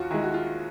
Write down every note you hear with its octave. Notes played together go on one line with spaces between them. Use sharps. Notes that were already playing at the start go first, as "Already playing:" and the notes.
Already playing: D#2 F4 F#4
D#3 G#3 E4
F#4
F4